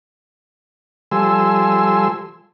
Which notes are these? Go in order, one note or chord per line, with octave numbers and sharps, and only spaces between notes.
F3 G3 A4 G#5 C6 E6